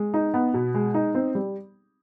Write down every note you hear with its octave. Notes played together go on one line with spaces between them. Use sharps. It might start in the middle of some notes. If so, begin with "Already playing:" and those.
Already playing: G#3
D#4
B3
B2
G#3
D#4
C4
G3